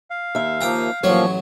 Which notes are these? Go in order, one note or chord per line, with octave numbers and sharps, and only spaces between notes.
F5
D#2 E5
F3 A#3 G5 A#5
A1 A#2 F3 F#3 C#5 C#6